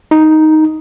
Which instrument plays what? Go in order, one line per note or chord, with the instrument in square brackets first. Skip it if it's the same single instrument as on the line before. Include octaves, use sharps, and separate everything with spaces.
[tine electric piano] D#4